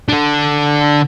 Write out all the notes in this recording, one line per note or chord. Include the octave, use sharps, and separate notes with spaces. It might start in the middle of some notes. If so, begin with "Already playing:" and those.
D3 D4